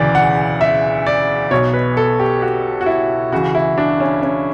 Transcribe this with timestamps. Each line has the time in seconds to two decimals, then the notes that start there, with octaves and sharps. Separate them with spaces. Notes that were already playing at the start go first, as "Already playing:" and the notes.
Already playing: E1 D2 C#3 E3 D5
0.15 F#5
0.61 E5
1.06 D5
1.51 B1 B2 C#5
1.74 B4
1.97 A4
2.20 G4
2.42 F#4
2.81 F#4
2.86 E4
3.32 C#2 C#3 E3 F#4
3.55 E4
3.78 D4
4.00 C#4
4.23 C#4